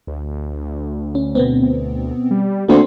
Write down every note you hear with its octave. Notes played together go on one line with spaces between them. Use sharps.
D2
C#4
B2 B3 C4
G3
D2 A#3 C4 C6